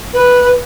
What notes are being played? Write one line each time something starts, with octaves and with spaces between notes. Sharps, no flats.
B4